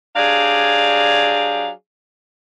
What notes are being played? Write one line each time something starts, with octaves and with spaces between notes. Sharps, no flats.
F#3 D4 G4 G#4 D5 F5